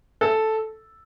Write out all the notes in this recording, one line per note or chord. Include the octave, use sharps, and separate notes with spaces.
A4